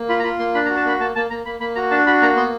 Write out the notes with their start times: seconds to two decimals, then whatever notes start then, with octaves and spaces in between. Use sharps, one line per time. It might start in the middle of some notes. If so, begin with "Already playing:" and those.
Already playing: A#3
0.09 F4 B5
0.19 A#5
0.24 F4 B5
0.39 A#3 C6
0.54 D4 B5
0.65 A#5
0.69 F#4
0.77 A5
0.85 A#3 B5
1.00 A#3 A5
1.16 A#3 A5
1.30 A#3 A#5
1.45 A#3 B5
1.60 A#3 B5
1.75 F#4 A#5
1.91 D4 A5
2.07 F#4 B5
2.22 A#3 A#5
2.36 B3 C6